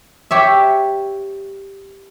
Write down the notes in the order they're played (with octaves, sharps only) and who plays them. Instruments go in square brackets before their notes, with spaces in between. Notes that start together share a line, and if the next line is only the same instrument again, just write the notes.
[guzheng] G4 C#5 E5